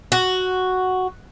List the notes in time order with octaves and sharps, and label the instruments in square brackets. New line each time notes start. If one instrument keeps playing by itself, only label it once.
[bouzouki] F#4